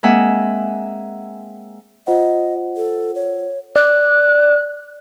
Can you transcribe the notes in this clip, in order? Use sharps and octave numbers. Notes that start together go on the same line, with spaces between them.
G#3 A#3 C4 G#4 E5 F#5
F4 C5 D#5 F#5
A4
C#5
D5 F#6